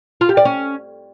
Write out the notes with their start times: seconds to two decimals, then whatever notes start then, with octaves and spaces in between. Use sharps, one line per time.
0.21 F4
0.29 G4
0.37 D5
0.45 C#4